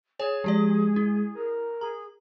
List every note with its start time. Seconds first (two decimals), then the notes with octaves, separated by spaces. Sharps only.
0.20 G#4 C#5 G#5
0.44 F3 G#3 G4 D5
0.96 E4
1.35 A#4
1.81 G#4 A#5